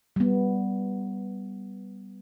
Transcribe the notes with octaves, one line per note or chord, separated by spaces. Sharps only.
G3 B3